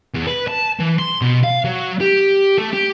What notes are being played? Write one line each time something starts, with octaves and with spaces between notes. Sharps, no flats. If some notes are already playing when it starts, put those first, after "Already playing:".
E2
B4
A5
E3
C6
B2
F5
F#3
G4
A3
G4